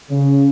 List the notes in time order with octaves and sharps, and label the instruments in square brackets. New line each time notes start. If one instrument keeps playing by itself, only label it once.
[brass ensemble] C#3